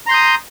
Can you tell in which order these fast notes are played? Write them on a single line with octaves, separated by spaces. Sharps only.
A#5 C6 G6 D#6